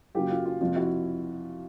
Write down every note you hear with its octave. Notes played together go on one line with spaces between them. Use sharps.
F#2 C#3 F#3 A#3 F4 G4
F4
F4
F2 C3 F3 A#3 F4
E4 F#4